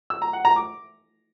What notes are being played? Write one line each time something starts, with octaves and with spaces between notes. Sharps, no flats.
E6
A#5
F#5
A#5
D6